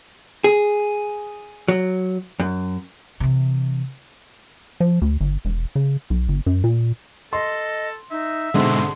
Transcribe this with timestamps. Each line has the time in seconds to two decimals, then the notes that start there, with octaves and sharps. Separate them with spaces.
0.44 G#4
1.68 F#3
2.40 F#2
3.20 C3 E3
4.80 F3
5.02 D2
5.20 G1
5.45 E1
5.75 C#3
6.10 B1
6.28 G1
6.46 F#2
6.64 A#2
7.33 A4 D#5 C6
8.11 D#4 E5
8.54 G#2 B2 D3 G#3 C4 C6